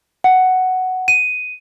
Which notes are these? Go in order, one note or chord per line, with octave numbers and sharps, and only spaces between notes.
F#5
D#7